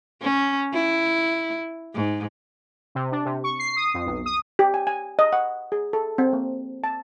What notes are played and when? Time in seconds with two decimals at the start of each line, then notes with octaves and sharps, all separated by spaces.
0.22 C#4
0.73 E4
1.95 G#2
2.95 C3
3.12 D4
3.25 C3
3.44 C#6
3.59 C7
3.77 D#6
3.94 F2
4.06 B1
4.26 D#6
4.59 G4
4.74 G#5
4.87 G#5
5.19 D#5
5.33 F#5
5.72 G#4
5.93 A4
6.18 C4
6.33 A#3
6.84 A5